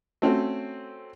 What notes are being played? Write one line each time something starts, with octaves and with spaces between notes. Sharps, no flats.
A3 C4 C#4 F#4